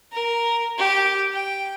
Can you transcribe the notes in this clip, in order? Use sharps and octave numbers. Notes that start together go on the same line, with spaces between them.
A#4
G4
G5